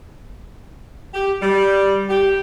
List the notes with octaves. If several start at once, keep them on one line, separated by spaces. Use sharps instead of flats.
G4
G3
G4